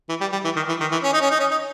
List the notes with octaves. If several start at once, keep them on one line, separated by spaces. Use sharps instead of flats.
E3
G3
G3
E3
D#3
E3
D#3
E3
C#4
D#4
C#4
D#4
C#4
D#4